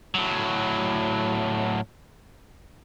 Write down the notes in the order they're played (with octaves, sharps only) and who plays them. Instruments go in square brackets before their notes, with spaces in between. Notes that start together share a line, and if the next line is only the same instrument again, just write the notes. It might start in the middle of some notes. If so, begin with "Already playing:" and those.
[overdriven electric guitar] A2 F#3